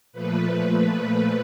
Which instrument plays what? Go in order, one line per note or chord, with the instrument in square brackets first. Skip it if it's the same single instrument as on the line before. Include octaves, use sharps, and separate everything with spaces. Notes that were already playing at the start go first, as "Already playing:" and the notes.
[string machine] A#2 F3 A3 B4